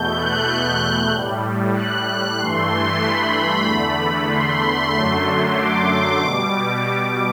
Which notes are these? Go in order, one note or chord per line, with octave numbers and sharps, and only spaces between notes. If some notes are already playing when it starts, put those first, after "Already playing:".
Already playing: E2 B2 A3 G6
F#6
A2 G3
F#6
G2 E3 A3 C6
B5
E2 D3 A3
C6
F#2 D3 F#3 A3
D6
B2 G3